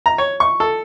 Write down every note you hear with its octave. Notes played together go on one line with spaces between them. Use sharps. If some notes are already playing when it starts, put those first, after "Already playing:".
A#5
C#5
C#6
A4